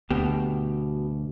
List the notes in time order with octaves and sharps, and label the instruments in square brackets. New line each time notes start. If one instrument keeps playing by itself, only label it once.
[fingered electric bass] D2 [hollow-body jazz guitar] B2 G4